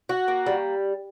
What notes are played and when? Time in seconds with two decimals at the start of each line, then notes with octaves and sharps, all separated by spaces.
0.09 F#4
0.28 A#3
0.46 G3